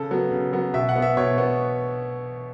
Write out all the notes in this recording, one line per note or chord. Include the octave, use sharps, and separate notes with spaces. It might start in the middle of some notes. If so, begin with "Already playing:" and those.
Already playing: C#3 A4
F#3 B3
C#3
F#3 B3
B2 E5
F#5
B3
E5
B2 C#5
B3